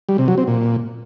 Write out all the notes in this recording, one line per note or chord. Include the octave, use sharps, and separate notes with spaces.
G3
C3
F#3
C4
A#2